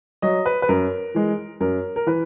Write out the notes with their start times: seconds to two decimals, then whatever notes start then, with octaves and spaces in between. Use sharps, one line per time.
0.22 F#3 D#5
0.46 B4
0.62 B4
0.69 F#2 A#4
1.14 E3 G#3
1.61 F#2 A#4
1.96 A#4
2.06 E3 B4